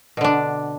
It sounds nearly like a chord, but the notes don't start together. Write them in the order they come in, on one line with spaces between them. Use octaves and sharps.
B2 D3 D4